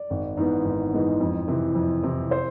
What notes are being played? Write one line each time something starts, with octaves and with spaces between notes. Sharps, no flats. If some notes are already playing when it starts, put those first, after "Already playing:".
Already playing: D5
G#1
G#2 E3 G#3 B3
G#1
G#2 E3 G#3 B3
F2
C3 E3
F2
C3 E3
C5